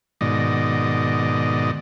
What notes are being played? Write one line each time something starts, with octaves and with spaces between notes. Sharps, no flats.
G#2 B2 D#3 D5 D#5